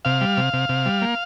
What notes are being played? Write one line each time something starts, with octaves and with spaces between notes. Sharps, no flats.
C3 F5
G3
C3
C3
C3
G3
A#3